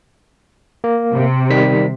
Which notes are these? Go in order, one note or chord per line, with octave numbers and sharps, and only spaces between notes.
A#3
C3
D#3 G3 B6